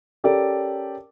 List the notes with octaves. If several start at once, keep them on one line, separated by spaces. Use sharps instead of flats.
C#4 G4 A4 A#4 D5